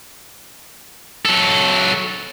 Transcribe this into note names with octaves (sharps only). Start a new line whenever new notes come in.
F#3 A4